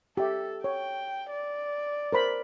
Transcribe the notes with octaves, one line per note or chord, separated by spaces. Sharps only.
G4 A4 E5
C#5 G5
D5
A#4 C5 B5